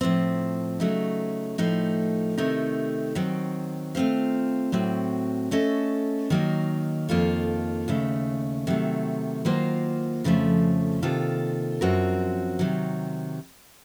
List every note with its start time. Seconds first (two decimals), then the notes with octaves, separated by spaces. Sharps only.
0.01 A2 F3 C4
0.80 C#3 F#3 A3 D#4
1.58 A2 F3 A3 D#4
2.38 C3 D#3 A3 D#4
3.15 D#3 F#3 C4
3.95 A3 C4 F4 C5 F5
4.72 A2 F#3 C4 F#4
5.51 A3 C#4 A4 D#5
6.30 D#3 F#3 A#3 D#4
7.09 F2 D#3 A#3 F4 A4
7.88 D#2 C#3 A3
8.67 C3 D#3 F#3 A3
9.45 D#3 F#3 A#3 F4 C5
10.24 F2 C#3 F3 A3
11.02 C3 D#3 A#3 F4 A4
11.81 F#2 F3 C4 F#4 A#4
12.59 C3 D#3 F#3